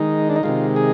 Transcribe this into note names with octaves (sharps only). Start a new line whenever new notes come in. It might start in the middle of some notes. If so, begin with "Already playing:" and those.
Already playing: D#3 G#3 D#4
D4
D#4
C3 D#3 G#3 F4
G#4